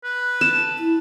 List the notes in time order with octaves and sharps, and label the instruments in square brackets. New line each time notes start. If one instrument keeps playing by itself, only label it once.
[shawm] B4
[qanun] A5
[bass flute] E4